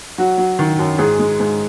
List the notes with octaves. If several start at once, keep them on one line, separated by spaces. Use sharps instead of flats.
F#3 F#4
F#3
D#3
F#2
G#2 G#4
G#3
G#2